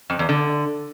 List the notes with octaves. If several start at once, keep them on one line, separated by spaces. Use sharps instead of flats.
F2
E2
D3